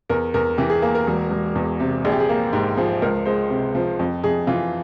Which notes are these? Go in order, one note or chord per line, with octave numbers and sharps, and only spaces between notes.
E2 A#4
E2 A#4
E3 G4
G#4
A#3
A#4
E1
E1
E2
C3
A#1 G#4
G4
G#4
A#3
G#2 G4
F3 G#4
C#2 A#4
G#3 C5
C3
F3
F2
F2 G#4
E3 F4